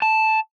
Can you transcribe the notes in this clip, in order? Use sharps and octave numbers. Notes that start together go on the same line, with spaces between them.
A5